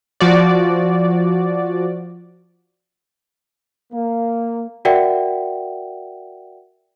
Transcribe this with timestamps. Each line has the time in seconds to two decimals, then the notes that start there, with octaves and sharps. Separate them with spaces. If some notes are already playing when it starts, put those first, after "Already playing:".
0.20 F3 F#4 D5
3.93 A#3
4.85 F#4 A#4 D5 E5 F#5 G5